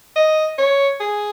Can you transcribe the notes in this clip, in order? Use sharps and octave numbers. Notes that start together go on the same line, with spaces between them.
D#5
C#5
G#4